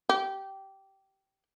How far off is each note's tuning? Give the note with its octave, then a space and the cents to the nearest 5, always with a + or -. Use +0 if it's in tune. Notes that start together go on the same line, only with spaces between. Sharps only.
G4 -15